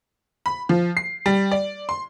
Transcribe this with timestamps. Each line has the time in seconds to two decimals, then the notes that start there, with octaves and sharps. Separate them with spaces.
0.46 B5
0.69 F3
0.97 C7
1.26 G3
1.51 D5
1.89 C6